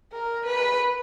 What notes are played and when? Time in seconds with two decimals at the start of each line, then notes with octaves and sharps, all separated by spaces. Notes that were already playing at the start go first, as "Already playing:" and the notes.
0.12 A#4
0.47 B4